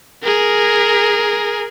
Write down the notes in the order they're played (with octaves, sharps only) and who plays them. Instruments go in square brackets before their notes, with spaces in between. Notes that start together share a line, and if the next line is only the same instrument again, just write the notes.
[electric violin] G#4 A#4